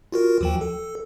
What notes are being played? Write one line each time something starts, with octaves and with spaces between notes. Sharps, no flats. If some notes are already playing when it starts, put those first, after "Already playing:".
F4 F#4 A#4
D#2 F3 G5
A4